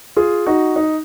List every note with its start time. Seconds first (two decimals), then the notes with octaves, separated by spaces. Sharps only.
0.17 F4 G#4
0.47 D#4 F#4
0.76 D#4